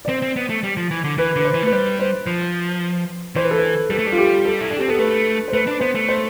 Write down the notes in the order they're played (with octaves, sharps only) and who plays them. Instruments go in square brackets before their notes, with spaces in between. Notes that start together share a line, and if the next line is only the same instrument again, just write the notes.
[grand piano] D5
[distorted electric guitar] C4 [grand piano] C5
[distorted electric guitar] C4
B3
A3
G3
F3
E3
D3
[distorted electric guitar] E3 [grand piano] B4
[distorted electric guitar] D3 [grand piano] B4
[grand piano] C5
[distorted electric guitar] E3
[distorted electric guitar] A3 [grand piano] B4
[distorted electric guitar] G3 [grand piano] C5
[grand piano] C5
[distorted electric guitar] F3
[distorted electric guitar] E3 [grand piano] C5
[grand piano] B4
A4
B4
[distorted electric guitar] G3 [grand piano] A4
[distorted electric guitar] A3
G3
[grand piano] F4
G4
A4
[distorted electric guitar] E4
D4
[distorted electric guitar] C4 [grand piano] G4
[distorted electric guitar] B3 [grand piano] A4
[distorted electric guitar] A3 [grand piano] B4
[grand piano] C5
[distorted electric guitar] A3 [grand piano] B4
[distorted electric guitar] D4
[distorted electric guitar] B3 [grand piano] C5
[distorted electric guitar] A3
[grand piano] C5